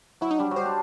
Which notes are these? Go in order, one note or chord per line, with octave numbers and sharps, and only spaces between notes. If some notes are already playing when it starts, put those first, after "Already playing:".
F#3 E4
D#4
G3 D4
F#3
G3 C5
D4